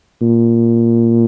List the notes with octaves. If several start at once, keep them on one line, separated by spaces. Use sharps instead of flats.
A#2